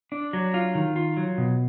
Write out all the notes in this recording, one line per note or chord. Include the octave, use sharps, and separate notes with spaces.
D4
F#3
F4
D#3
F4
F#3
B2